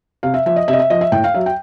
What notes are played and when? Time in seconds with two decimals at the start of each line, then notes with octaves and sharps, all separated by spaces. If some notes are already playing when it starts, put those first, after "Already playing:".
0.23 C3 F5
0.34 E5
0.46 F3 E5
0.56 D#5
0.68 C3 E5
0.73 D#5
0.80 E5
0.90 F3 D#5
1.01 E5
1.12 A2 G5
1.24 F5
1.34 F#3 E5
1.46 G5